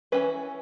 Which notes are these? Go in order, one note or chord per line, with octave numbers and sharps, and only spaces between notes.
E3 G3 C#4 B4